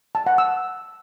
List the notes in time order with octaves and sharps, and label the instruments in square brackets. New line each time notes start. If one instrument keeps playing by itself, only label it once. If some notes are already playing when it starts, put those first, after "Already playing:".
[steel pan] A5
F#5
E6